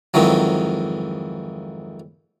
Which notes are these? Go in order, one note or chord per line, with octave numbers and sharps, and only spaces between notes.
F2 G#2 D#3 E3 F#3